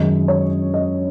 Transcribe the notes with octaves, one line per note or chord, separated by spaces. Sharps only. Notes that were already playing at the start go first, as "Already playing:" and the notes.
Already playing: F#2 D#3 G#3 D#5
C#5
D#5